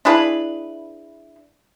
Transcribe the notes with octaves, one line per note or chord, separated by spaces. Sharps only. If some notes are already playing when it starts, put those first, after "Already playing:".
D4 E4 G#4 B4